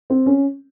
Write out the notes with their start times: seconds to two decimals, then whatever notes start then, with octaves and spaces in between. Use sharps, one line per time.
0.10 C4
0.26 C#4